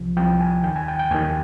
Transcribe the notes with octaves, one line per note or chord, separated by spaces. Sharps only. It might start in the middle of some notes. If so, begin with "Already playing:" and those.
Already playing: C2 C3 F3
C2 C3 F3 G5
G#5
D#2 D#3 G5
G#5
G5
G5
D#2 D#3 G#5